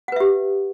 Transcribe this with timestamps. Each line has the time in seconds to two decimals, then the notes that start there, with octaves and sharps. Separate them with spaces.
0.08 F#5
0.12 B4
0.16 E5
0.20 G4